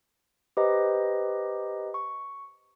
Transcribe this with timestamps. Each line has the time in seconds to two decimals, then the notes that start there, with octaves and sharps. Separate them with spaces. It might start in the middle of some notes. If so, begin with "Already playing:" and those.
0.57 G4 B4 C5 D#5 A#5
1.94 C#6